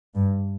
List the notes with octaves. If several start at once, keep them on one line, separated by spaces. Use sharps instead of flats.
G2